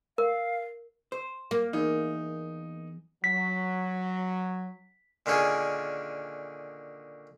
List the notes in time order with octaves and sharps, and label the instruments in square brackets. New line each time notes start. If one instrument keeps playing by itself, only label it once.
[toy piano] A#4 [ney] F5
[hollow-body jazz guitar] C5
[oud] A#3
[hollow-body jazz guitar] E2 [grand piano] D#4
[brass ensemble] F#3 [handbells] B6
[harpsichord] A#2 D3 D#3 C#4 G#4